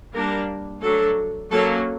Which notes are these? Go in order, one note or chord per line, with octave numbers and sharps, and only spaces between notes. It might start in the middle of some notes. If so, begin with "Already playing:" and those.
G3 A#3 D4 A#4
F#3 A3 D4 A4
F#3 A#3 C#4 A4